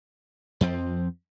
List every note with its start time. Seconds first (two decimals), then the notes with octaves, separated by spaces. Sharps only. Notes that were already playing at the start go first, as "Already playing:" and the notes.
0.61 F2 F3 C4